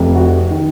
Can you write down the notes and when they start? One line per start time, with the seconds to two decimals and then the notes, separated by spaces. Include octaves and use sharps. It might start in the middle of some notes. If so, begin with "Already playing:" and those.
Already playing: F1 F2 C3 F3
0.16 F#4
0.50 D#3